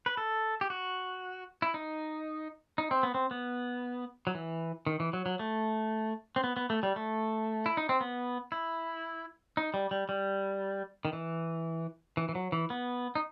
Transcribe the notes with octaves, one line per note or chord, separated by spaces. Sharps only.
B4
A4
G4
F#4
E4
D#4
D#4
C4
B3
C4
B3
F#3
E3
D#3
E3
F#3
F#3
A3
C4
B3
B3
A3
G3
A3
E4
D#4
C4
B3
E4
D#4
G3
G3
G3
D#3
E3
E3
E3
F#3
E3
B3
D#4